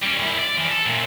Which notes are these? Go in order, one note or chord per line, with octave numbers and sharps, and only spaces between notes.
G3 C#4
F#2 E4
D5
E3 F3
A4
F#2 A#2